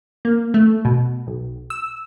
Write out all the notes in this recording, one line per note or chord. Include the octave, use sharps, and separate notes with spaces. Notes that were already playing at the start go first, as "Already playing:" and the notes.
A#3
A3
B2
B1
E6